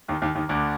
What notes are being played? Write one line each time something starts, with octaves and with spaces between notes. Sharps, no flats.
D#2 D#3
D#2 D#3
D#2 D#3
D2 D3